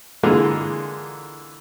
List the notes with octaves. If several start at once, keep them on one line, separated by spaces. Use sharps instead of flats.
D3 E3 G#3 A#3 F4 G#4